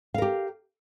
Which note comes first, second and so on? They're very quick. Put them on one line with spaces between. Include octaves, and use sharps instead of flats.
F5 A#4 G4